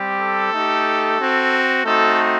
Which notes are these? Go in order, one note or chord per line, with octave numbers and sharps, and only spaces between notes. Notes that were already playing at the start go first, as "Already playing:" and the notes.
Already playing: G3 C4 G4
A4
A3 D#4 G4
C4 F#4
A3 C4 D#4 F#4 A4